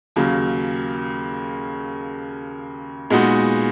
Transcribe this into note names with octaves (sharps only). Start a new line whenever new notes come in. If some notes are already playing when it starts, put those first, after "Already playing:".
D#2 C#3 F#3 A#3
A#2 G#3 B3 D#4 F#4